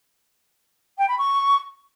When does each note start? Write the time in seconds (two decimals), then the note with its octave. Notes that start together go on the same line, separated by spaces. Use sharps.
0.98 G5
1.08 B5
1.18 C#6